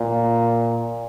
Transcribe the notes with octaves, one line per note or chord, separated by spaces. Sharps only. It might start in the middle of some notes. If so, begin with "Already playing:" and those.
Already playing: A#2